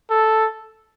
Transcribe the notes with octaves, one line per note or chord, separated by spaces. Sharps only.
A4